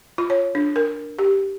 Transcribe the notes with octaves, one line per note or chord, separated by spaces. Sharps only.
F4
C#5
D4
A#4
G4